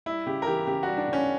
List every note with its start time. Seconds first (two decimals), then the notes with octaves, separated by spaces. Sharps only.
0.06 G3 E4
0.26 C#3 G4
0.42 A#4
0.47 E3 G4
0.67 C#3 G4
0.83 G3 F#4
0.97 D4
1.08 C#3
1.13 C#4